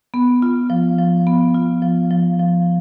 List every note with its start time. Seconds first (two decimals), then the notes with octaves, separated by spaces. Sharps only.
0.14 B3
0.42 F4
0.70 F3
0.98 F3
1.27 B3
1.54 F4
1.82 F3
2.11 F3
2.39 F3